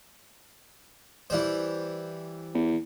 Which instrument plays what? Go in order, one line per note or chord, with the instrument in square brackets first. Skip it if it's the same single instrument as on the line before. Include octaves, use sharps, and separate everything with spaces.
[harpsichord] E3 G3 C5
[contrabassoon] E2